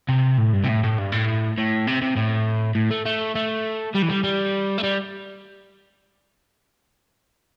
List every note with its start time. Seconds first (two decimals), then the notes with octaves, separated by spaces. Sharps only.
0.09 C3
0.38 A2
0.53 G2
0.64 C3
0.69 A2
0.83 A2
0.98 G2
1.12 A2
1.58 A2
1.87 C3
2.01 C3
2.16 A2
2.75 A2
2.91 A3
3.05 A3
3.35 A3
3.95 G3
4.02 E3
4.09 G3
4.24 G3
4.78 A3
4.83 G3